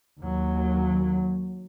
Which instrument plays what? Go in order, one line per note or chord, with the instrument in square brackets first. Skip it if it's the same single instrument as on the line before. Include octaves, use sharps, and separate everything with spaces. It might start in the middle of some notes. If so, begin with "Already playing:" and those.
[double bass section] D#2 F#3